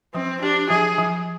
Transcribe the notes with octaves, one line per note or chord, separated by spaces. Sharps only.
F3 C4
D4 G4
F3 G#4
F3